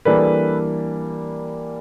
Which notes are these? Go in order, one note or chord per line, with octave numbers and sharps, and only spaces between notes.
E3 G3 A#3 D4 A4 B4